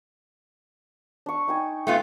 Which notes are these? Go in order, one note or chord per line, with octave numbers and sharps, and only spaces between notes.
D4 C#6
D#4 G5 G#5
A3 B3 F4